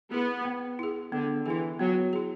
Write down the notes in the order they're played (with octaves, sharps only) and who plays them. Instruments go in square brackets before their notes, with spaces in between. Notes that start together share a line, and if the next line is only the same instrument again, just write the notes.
[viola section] B3 [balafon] E4 G#4
[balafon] B3
E4 G#4
[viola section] D3 [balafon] B3
[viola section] E3 [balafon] E4 G#4
[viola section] F#3 [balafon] B3
[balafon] E4 G#4